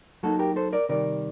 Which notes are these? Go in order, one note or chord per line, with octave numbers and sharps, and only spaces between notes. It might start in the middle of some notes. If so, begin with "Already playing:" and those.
F#3 A#3 D#4 F#4 A4
G4 A#4
A4 C5
A#4 D5
C3 D#3 G3 A#4 D5